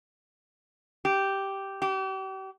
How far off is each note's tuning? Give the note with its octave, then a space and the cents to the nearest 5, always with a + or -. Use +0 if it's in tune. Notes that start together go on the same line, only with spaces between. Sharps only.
G4 -5
G4 -40